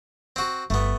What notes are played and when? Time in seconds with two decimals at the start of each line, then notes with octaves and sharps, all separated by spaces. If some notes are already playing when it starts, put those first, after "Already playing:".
0.36 C4 F#4
0.70 G1 A3 B3